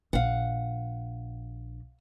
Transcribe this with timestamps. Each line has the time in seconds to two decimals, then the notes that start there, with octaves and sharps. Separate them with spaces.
0.13 A#1 F5 F#5